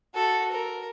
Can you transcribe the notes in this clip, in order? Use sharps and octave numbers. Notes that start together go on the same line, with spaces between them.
F#4 A4
A#4